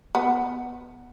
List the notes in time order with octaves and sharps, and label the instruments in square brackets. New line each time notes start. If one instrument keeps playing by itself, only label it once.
[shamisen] B3